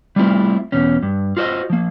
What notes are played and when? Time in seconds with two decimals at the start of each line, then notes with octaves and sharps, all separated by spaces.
0.16 G3 A3 C4 E4 F4
0.72 E2 B2 C#4
1.03 G2
1.37 F4 F#4 C5 D5 D#5
1.70 F3 A#3